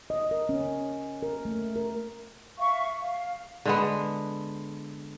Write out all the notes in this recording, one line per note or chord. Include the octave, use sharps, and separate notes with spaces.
D#5
A#4
C#4
A#4
A3
A#4
E5 F5 C#6
F5
D3 G#3 B3